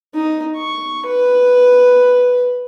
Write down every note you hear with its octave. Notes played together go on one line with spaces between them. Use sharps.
D#4
C#6
B4